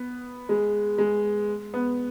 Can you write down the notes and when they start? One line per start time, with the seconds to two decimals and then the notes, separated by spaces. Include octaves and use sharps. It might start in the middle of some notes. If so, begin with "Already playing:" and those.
Already playing: B3
0.49 G#3
0.98 G#3
1.74 B3